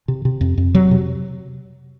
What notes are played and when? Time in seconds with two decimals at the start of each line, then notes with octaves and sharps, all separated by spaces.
0.08 C3
0.25 C3
0.41 F2
0.58 F2
0.74 C3 F#3
0.91 C3